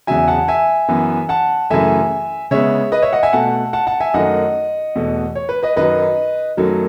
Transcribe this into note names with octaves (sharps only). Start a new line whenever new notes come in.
E2 C#3 F#3 E5 G#5
F#5 A5
E5 G#5
F#2 E3 B3
F#5 A5
F#2 C#3 E3 A3 E5 G#5
C#3 G#3 B3 C#5 E5
B4 D#5
C#5 E5
D#5 F#5
E5 G#5
B2 A3 F#5 A5
F#5 A5
F#5 A5
E5 G#5
F#2 D#3 A3 D#5 F#5
E2 B2 A3
C#5
B4
B4 D#5
F#2 D#3 F#3 B4 D#5
F#2 D#3 F#3 A3